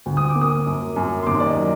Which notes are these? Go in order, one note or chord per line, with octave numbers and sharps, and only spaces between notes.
D2
D#6
D6
A#3
D#6
F#2
F#2
C6
D#2 D6
D5
D#5
F#3